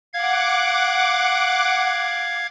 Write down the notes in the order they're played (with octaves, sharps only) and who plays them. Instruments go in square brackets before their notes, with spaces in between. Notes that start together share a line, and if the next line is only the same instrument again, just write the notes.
[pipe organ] F5 G#6 [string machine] F#5 D6